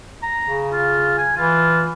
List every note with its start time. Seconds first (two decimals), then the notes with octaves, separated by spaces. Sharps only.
0.23 A#5
0.43 C#3
0.72 F4
1.18 G#5
1.37 E3 F4